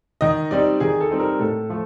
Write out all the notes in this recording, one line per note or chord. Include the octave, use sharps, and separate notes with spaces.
D#3 D#5
G3 C4 D#4 D5
D#3 G#4
A4
G3 C4 D#4
A#4
A2 A4
F3 A3